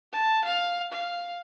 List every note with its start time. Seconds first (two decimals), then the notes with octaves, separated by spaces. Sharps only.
0.13 A5
0.45 F5
0.92 F5